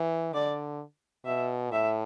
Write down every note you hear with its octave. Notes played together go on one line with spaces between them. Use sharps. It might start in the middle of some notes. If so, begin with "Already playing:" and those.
Already playing: E3
D3 D5
B2 E5
A2 E5